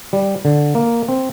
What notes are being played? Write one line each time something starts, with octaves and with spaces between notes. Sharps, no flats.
G3
D3
A#3
C4